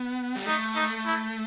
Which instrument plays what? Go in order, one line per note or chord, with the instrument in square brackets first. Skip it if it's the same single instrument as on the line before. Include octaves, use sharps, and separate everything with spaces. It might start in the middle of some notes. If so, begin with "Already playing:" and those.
Already playing: [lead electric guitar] B3
G3
[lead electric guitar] A3 [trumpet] D#4
[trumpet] D#4
E4